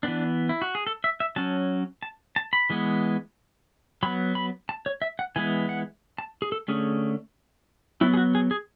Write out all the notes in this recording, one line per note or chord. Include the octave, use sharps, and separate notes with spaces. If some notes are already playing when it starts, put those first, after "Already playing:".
E3 B3 D4
E4
F#4
G#4
A4
E5
E5
F#3 C#4 A5
A5
A5
B5
E3 G#3 B3
F#3 B3 B5
B5
A5
C#5
E5
F#5
E3 G#3 B3 G#5
F#5
A5
G#4
A4
D3 A3 C#4 G#4
F#3 B3 E4
G#4
F#4
G#4
G#4